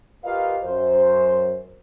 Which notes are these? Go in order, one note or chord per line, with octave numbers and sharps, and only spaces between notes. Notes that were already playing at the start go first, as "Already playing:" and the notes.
F4 G4 A#4 B4 D#5 F5
F#2 C5